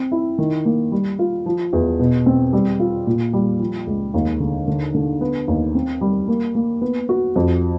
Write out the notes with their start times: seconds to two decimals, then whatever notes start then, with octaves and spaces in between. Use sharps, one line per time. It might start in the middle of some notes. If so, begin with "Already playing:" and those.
Already playing: C4
0.12 E4
0.38 D#3
0.65 A#3
0.92 G3
1.19 F4
1.46 F3
1.73 E2
2.00 B2
2.26 C4
2.53 G3
2.80 F4
3.07 A#2
3.33 G3
3.60 F3
3.87 C#2
4.14 D#2
4.40 D3
4.67 D3
4.94 D3
5.21 B3
5.48 D#2
5.75 C4
6.01 G3
6.28 A#3
6.55 A#3
6.81 B3
7.09 F#4
7.36 F2